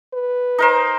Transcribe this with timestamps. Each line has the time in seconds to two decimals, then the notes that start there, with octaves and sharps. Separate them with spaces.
0.14 B4
0.58 D#4 A#4 C5